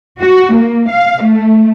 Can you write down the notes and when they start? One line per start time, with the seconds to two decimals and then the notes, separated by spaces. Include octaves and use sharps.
0.20 F#4
0.54 A#3
0.90 F5
1.23 A3